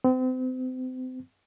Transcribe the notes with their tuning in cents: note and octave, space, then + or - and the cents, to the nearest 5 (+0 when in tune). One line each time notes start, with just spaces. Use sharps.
C4 -35